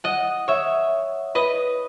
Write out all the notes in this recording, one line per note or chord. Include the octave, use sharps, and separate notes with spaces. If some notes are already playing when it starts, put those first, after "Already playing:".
D#5 F#5
C#5 E5
B4 D#5